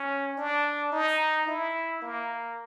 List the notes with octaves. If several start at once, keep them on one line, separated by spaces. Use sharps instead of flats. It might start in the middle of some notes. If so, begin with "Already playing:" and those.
Already playing: C#4
D4
D#4
E4
A#3